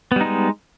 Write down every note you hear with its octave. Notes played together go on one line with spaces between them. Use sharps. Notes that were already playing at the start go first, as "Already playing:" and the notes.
G3 G#3 B3 D#4